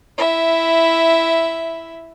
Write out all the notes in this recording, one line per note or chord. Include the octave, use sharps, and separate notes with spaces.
E4 E5